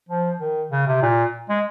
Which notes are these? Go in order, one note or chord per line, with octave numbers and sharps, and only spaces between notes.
F3
D#3
C#3
C3
A#2
G#3